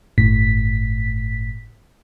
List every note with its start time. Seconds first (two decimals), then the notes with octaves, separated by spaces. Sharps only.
0.18 G1 A2 B6